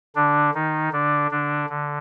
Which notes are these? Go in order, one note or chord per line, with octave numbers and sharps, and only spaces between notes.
D3 D4
D#3 D#4
D3 D4
D3 D4
D3